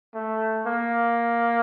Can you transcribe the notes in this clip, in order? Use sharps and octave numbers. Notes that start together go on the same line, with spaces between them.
A3
A#3